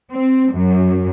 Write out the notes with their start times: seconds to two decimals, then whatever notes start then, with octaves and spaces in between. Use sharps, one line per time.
0.11 C4
0.53 F#2